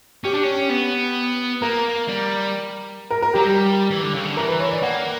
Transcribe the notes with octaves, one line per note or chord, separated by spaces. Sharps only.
C#4 G4
D4
C#4
B3
A#3 A#4
G3
A#4
A#4
F#3 G4
G3
E3
D3
C#3
D3
E3 A#4
B4
C#5
D5
A#3 F#5